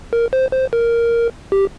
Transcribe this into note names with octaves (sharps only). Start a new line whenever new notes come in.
A#4
C5
C5
A#4
G4